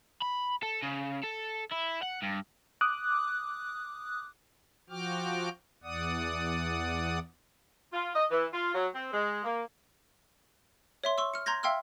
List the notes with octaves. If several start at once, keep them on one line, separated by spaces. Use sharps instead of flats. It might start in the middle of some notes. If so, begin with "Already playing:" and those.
B5
A4
C#3
A4
E4
F#5
G2
D6 D#6 F#6
F3 F#4 G5 D6 F6
E2 D5 F#5 D#6
F4
D#5
E3
F4
F#3
C4
G#3
A#3
C#5 E5 C6
C6 C#6 E6
F6 C#7
A#5 C6 G6 G#6 A#6
E5 F5 G5 C6 E6 F6